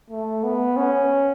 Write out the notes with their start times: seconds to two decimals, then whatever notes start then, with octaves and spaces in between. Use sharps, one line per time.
0.10 A3
0.44 B3
0.77 C#4